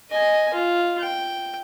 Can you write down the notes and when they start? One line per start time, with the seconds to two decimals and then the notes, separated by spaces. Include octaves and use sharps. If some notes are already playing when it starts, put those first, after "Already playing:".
0.11 D#5 G#5
0.53 F4
1.00 G5